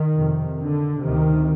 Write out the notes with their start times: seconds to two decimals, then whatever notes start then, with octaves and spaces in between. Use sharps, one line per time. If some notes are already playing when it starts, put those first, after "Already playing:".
Already playing: D#3
0.15 F2 C3
0.59 D3
1.03 D2 C3 D#3